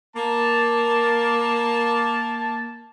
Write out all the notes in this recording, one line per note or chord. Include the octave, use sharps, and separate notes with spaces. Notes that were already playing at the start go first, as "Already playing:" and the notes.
A#3 A5